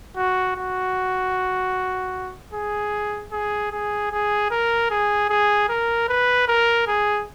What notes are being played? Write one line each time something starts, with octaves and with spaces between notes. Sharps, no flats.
F#4
F#4
G#4
G#4
G#4
G#4
A#4
G#4
G#4
A#4
B4
A#4
G#4